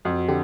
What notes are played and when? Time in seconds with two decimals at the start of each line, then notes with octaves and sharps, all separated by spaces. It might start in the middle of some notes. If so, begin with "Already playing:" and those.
0.05 F2 F#4
0.28 D3 G4